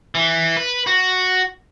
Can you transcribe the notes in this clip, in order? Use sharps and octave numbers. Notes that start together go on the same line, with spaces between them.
E3
B4
F#4